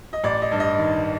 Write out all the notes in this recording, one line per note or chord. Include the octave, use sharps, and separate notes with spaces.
D#5
A1 D5
D#5
G2
D#5
D#3